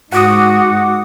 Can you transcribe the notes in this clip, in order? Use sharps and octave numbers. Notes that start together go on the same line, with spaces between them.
G#2 F#4 F#5 D6 D#6